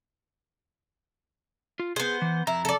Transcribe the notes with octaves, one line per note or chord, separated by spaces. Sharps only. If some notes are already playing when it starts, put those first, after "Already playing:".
F4
B3 G#4 C5
E3
F2 E4 A#5
A4 D5